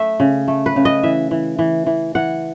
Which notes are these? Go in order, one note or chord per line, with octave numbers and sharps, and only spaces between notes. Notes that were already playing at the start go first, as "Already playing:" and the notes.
Already playing: A3 E5
C#3
A3
B4
C#3
D#5
E3 E5
E3
E3
E3
E3 F#5